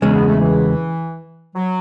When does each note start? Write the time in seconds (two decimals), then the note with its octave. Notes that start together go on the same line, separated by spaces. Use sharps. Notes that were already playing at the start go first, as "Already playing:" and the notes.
0.01 E2 C#3 G#3 C#4
0.14 B3
0.27 A3
0.40 E3
1.55 F#3